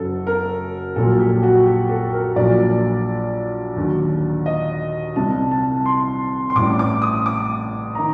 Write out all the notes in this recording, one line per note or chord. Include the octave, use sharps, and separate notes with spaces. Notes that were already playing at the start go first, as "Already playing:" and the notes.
Already playing: F#1 F#2 F#3 A4
A#4
A#1 A#2 F#3 A4
G4
F#4
G4
A4
A#4
A#1 A#2 F#3 D5
D#2 D3 F#3
D#5
C2 C3 G3 A5
A5
C6
C6
A1 A2 G3 D6
D6
D#6
D6
D#3 A#5